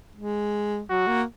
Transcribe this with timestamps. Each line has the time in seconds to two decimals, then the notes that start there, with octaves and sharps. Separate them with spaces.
0.16 G#3
0.89 F#3 F#4
1.07 A#3